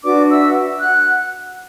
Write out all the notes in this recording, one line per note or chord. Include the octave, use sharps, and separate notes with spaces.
D4 F#4 B4 D5 D6
E5 E6
F#5 F#6